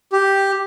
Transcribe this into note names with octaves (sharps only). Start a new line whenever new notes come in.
G4